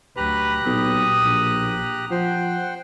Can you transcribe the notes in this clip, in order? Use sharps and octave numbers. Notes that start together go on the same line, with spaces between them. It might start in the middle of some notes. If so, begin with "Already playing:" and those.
D2 F#3 G4 B4 A#5 F#6
B1 A#2 D#6
A#1
F3 C5 F#5 G5